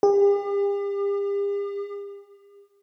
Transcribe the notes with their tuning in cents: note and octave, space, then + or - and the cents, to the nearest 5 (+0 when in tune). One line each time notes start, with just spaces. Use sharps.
G4 +45